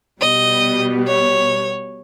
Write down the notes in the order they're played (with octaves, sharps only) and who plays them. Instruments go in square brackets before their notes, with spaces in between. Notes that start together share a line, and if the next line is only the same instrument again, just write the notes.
[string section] B2 G3 B3 [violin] D#5
[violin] C#5